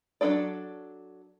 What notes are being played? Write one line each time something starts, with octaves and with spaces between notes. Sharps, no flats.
F#3 B3 D4 A4 D5